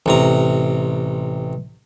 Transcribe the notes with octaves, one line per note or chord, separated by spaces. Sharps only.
A1 C3 A#5